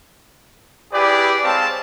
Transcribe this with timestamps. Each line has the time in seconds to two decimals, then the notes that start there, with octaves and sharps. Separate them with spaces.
0.93 E4 G4 G#4 B4 D5
1.44 G#3 C4 C#5 F5 G5 A5